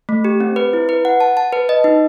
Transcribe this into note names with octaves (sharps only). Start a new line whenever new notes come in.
A3
G4
C4
B4
E4
B4
F#5
A5
A5
B4
D#5
D#4